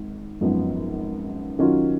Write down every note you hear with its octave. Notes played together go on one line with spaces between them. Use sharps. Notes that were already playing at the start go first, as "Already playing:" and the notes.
Already playing: G#1
G#1 F#2 F3 B3
D#3 F#3 C#4 F4